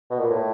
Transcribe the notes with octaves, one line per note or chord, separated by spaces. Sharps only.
B2
A#2
A2